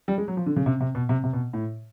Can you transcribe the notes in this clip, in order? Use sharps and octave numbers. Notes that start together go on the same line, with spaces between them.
G3
G#3
F#3
F3
D3
C#3
C3
C3
B2
C3
C3
B2
A2